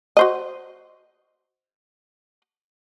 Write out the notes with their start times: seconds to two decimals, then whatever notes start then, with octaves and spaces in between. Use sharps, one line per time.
0.17 F#4 C5 D#5